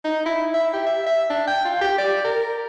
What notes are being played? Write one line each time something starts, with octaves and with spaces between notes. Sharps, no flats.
D#4
E4
E5
G4
E5
E5
D4
G5
F4
G4
D5
A#4